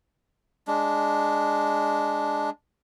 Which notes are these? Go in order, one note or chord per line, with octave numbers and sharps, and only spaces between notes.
G#3 D4